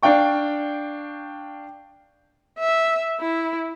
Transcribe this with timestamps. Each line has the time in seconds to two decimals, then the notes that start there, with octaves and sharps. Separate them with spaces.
0.03 D4 F5 G5 C#6
2.59 E5
3.21 E4